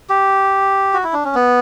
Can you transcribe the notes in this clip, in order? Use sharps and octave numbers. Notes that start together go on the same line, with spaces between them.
G4
F#4
E4
D4
C#4
B3